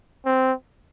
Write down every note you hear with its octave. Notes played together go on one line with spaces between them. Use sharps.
C4